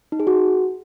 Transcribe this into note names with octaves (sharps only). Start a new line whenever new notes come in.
D#4
G#4
F#4